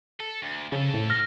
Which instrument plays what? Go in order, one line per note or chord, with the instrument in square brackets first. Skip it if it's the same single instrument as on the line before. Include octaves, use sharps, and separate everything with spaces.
[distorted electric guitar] A4
D2
[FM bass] C#3 [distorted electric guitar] F3 A4
[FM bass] A2
[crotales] F6 A#6